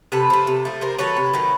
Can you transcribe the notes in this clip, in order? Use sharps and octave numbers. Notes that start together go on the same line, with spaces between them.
C3 A4 B4
F3 A3
C3
F3 A3
C3 A#4 C5
D#3 F#3 A3 B4 C#5
C3
D#3 F#3 A3